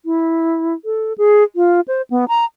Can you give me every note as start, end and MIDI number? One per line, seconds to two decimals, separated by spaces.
0.05 0.74 64
0.85 1.13 69
1.18 1.43 68
1.56 1.80 65
1.88 2.02 72
2.10 2.25 59
2.28 2.45 82